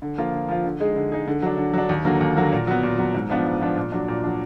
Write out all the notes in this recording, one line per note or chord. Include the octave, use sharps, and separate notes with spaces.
D3
F3 A#3 F4
D3
F3 A#3 F4
D3
G#3 D#4 G#4
D3
G#3 D#4 G#4
D3
F#3 D4
D3
F#3 D4
D#2
D3 F#3 A#3
D#2
D3 F#3 A#3
A#2
F#3 B3
A#2
F#3 B3
G#2
F3 B3 D4 F4
G#2
F3 B3 D4 F4
A#2
F#3 D4
A#2
F#3 D4